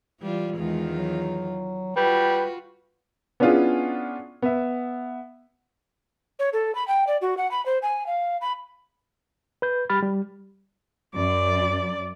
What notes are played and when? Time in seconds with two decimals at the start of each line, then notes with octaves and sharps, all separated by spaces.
0.20 E3 G3 F4
0.57 E2 D#3 G#3 F4
0.94 F#3
1.96 G3 F4 F#4 B4
3.40 B3 C#4 D4 E4 F4 G#4
4.42 B3 E5
6.39 C#5
6.53 A4
6.75 B5
6.88 G5
7.07 D5
7.22 F#4
7.37 F#5
7.51 B5
7.66 C5
7.82 G#5
8.07 F5
8.41 B5
9.62 B4 G6
9.90 G3 G4 B5 F6 A6
10.03 G3
11.15 F#2 D5